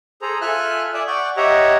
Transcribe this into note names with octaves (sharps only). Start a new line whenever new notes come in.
G#4 A4 C5 A#5
F4 A4 E5 G#5 F6 F#6
D5 E5 G#5 D#6
D5 F#5 C#6 G6
G4 C#5 D#5 E5 F#5 A#5